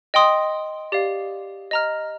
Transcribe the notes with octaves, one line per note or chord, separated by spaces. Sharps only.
D#5 G5 C6 D#6
G4 D5 F5
D#5 A#5 F6